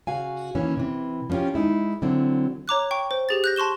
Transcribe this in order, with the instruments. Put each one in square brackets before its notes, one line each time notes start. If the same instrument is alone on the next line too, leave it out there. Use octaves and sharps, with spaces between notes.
[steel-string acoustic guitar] C#3 F#4 F5 G#5
D#3 E3 A#3 C#4
C3 E3
F3 B3 C#4 F4 G4
G#3 D#4 E4 G#4
D3 F#3 C4 E4
[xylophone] C#5 A#5 D6 F#6
G5 C#6
C5
G4 G#4 A6
F#6 G6 A#6
A5 C6 C#6 E7 G7